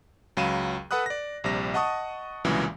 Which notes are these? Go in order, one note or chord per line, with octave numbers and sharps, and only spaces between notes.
C#2 F#3 F5 B5 D#7 E7
A4 B4 F#5 B5 D#6 F#6
D5 A#6
A#1 C3 G3 A#6
D#5 F#5 A5 C#6 D#6
C2 A#2 C#3 E3 F#3 G#3